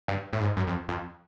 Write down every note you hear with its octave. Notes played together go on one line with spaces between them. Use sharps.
G2
A2
G#2
F#2
F2
F2